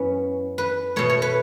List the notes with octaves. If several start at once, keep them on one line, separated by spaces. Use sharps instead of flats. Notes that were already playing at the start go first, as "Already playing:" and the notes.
Already playing: F#2 E3 B3 C#4
B4
B2 A3 C#5
C#5
B4